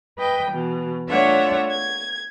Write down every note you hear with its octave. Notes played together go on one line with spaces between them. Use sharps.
B4 D#5 G5
B2 E3
A3 D4 F4 C#5 E5 F#5
G#6